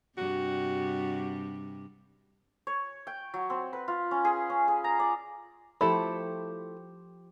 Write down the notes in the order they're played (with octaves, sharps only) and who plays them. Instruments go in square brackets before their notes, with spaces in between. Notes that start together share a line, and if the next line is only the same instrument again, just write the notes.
[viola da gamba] G2 C3 G3 [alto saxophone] F#4
[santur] C#5
G5
F#3
C4
B4
F4
C#4
G#4
C#4
G#4
A#5
D5
[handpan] F3 G4 C5 [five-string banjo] A3 E4 A4 [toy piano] B5